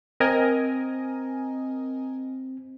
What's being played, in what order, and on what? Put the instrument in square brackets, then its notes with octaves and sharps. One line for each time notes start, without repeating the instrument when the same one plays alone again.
[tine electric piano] C4 [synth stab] A#4 D#5 G#5